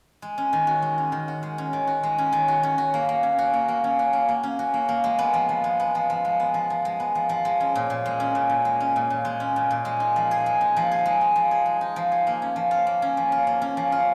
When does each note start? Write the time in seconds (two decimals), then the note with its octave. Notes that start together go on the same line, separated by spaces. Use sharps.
0.22 G#3
0.38 C#4
0.53 D#3
0.67 F#4
0.82 G#3
0.98 C#4
1.12 D#3
1.28 F#4
1.43 G#3
1.58 C#4
1.73 D#3
1.87 F#4
2.03 G#3
2.18 C#4
2.33 D#3
2.48 F#4
2.63 C#4
2.78 F#4
2.94 A#3
3.09 A#3
3.23 C#4
3.38 F#4
3.54 A#3
3.68 A#3
3.84 C#4
3.99 F#4
4.13 A#3
4.28 A#3
4.43 C#4
4.59 F#4
4.74 A#3
4.89 A#3
5.04 G#3
5.19 B3
5.34 F3
5.49 F3
5.64 G#3
5.80 B3
5.95 F3
6.10 F3
6.25 G#3
6.40 B3
6.54 F3
6.70 F3
6.85 G#3
7.00 B3
7.15 F3
7.29 F3
7.45 G#3
7.60 C#4
7.76 A#2
7.90 A#2
8.06 G#3
8.20 C#4
8.35 A#2
8.50 A#2
8.65 G#3
8.80 C#4
8.96 A#2
9.10 A#2
9.25 G#3
9.40 C#4
9.56 A#2
9.71 A#2
9.85 G#3
10.00 D#4
10.16 F3
10.31 G#4
10.46 G#3
10.61 D#4
10.76 F3
10.92 G#4
11.06 G#3
11.21 D#4
11.36 F3
11.51 G#4
11.66 G#3
11.81 D#4
11.96 F3
12.12 G#4
12.27 A#3
12.42 C#4
12.56 F3
12.71 F4
12.87 A#3
13.02 C#4
13.17 F3
13.32 F4
13.47 A#3
13.62 C#4
13.77 F3
13.92 F4